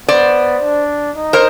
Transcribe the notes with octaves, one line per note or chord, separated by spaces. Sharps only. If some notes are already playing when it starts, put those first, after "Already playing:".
B3 C5 D5
D4
D#4
A#4 C5